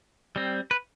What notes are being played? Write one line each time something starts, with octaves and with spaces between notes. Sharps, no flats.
G3 C4
B4